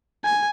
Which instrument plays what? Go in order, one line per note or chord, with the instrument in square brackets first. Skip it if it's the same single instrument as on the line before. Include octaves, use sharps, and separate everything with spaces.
[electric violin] G#5